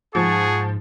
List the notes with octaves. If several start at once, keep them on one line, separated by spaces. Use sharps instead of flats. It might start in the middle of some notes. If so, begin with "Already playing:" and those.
G#2 F3 G#4 F#5 A5 C#6